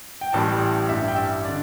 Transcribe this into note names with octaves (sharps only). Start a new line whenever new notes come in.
G5
A1 A2 E3 G3 A5
A1 G2 G3 E5
G5
E5
D3 D5